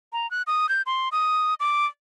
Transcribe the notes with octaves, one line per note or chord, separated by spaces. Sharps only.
A#5
F#6
D#6
G6
C6
D#6
D6